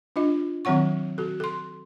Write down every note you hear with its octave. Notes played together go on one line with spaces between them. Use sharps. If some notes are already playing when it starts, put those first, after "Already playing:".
D4 F4 D#5
D#3 F#3 C4 C#5 F#5 C#6
F#4 A4
A4 C6